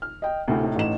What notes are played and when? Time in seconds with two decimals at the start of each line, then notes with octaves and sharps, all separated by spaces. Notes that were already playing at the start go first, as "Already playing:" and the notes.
0.02 F6
0.22 D#5 G5
0.48 D2 A2 C3
0.63 A2 D#4
0.76 A1 E7